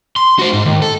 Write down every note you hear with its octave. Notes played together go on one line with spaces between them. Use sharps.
C6
F#4 C5
G#2
D#2
A4